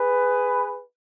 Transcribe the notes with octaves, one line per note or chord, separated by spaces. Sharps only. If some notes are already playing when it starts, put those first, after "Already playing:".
Already playing: G#4 B4